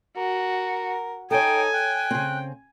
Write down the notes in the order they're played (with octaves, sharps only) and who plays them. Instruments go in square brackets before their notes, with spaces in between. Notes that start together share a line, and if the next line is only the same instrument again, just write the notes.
[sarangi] F#4 [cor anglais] A#4
[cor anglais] D#4 [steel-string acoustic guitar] A4 C#5 [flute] G5 [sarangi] G#5
[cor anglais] G5 [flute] F#6
[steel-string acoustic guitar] C#3 C4